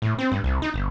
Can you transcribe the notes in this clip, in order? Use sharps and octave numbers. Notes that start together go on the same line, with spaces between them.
A2
C4
G2
C2
D#4
G1